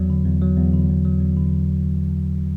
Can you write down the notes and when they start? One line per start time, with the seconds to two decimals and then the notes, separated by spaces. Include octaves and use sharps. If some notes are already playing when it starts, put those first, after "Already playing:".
Already playing: E2 F#3
0.10 D3
0.25 E2
0.42 F#3
0.57 E2
0.74 D3
0.89 E2
1.05 F#3
1.21 E2
1.37 D3